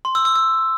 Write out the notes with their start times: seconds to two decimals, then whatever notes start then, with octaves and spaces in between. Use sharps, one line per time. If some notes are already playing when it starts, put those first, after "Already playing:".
0.05 C6
0.15 E6
0.25 E6
0.35 E6